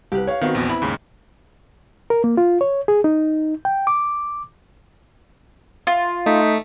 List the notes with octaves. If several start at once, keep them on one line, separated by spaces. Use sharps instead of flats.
C2 G4 B4
C#5 F5
D#3 B3 C4 F#4 F5 F#5
A#1 E2 F#4
E4 B5
D#2 G#2 C#3
A#4
A#3
F4
C#5
G#4
D#4
G5
D6
F4
A3 D#4 B6